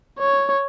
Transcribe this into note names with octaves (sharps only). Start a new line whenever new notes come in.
C#5